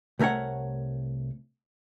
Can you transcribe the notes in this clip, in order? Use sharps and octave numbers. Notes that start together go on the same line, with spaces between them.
C2 A3 A#4 C#5 F#5